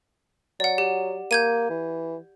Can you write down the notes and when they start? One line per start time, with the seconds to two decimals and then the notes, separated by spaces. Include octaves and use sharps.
0.60 F#3 D5 F#5
0.78 G4
1.31 A#3 G6 G#6 D#7
1.70 E3